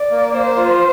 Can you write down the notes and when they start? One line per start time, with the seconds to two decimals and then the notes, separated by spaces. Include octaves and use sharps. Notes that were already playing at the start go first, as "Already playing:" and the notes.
Already playing: D5
0.11 A#3
0.34 A#3 C5
0.56 F4